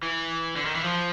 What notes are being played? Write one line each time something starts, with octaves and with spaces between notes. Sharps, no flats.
E3
D3
D#3
E3
F3